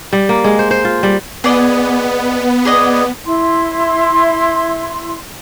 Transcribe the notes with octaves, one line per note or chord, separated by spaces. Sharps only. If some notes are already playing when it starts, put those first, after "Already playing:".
G3
A#3
G#3
C5
C5
F4
G3
B3 G#4 D5 D#5
G#4 D5 D#5
E4 C6